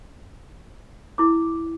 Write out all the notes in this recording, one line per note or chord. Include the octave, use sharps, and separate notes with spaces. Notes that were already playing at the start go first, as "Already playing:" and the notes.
E4 D6